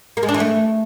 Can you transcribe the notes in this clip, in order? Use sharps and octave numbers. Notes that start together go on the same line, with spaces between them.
A#3
G#3
D4
E3
A3